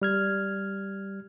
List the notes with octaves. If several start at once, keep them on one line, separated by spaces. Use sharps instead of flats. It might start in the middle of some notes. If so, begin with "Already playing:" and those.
G3 F6 G#6